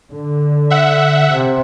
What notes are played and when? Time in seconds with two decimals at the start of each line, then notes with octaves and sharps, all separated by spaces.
0.12 D3
0.70 E5 F#5
1.32 C3